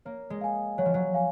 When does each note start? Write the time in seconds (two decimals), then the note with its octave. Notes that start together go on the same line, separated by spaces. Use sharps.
0.05 A#3 C#5
0.30 G#3
0.41 F5 G#5
0.78 F#3 C#5
0.86 F3
0.94 F#3
1.14 F5 G#5